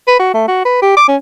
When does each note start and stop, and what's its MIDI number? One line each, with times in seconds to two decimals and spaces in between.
0.07 0.19 71
0.20 0.34 66
0.34 0.44 57
0.48 0.62 66
0.65 0.81 71
0.82 0.93 67
0.97 1.04 86
1.08 1.16 61